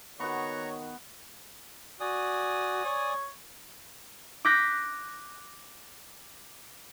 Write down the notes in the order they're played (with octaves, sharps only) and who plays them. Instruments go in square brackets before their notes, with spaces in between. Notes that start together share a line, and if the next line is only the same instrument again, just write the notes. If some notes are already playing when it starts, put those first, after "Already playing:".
[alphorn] D#3 [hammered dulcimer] B3 F#4 [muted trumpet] C#5 [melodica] A#5 C#6
[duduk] F#4 [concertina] D5 G#5 D#6
[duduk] C#5
[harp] D6 F#6 G6 A#6 B6